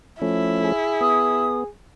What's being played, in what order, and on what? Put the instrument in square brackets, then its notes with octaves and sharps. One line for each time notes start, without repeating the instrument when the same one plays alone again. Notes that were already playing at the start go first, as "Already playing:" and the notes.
[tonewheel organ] F3 A3 C#4 [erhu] E4
[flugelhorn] G#4
[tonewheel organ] B3 [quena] D#6